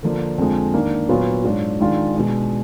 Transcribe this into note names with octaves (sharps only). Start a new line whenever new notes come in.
D3 F3 A#3 D4
F2 D3 F3 G#3
D#3 A#3 D4
A#2 F#3 B3 F4
G#2 F#3 D4 F4
D#3 G#3 D4 F4
B2 G#3 D4